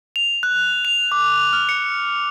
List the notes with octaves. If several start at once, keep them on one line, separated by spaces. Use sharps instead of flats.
F7
F#6
F7
D6
F6
C#7